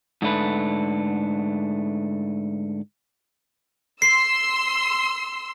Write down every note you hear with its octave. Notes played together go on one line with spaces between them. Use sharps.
G#2 D3 A3 B4
C6 E6 C7